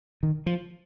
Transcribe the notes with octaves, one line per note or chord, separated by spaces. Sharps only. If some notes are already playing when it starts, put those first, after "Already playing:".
D#3
F3